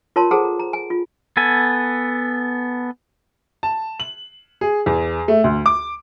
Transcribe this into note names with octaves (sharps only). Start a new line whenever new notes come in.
F4 A#4 C#5 A5 C6
G#4 A4 C5 F#5 A5 A#5
A#5
A#5
G#5
F4
B3 A4 G#5
A5
F#7
G#4
E2
A3
D2
D6